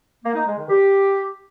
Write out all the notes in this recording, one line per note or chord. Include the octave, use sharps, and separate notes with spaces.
A#3
D#4
G#3
D#3
G4